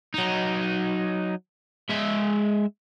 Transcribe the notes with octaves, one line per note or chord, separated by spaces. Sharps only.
F#3 D#4
G#3 E5